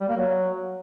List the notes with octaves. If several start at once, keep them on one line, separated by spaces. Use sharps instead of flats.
G3
A#3
F#3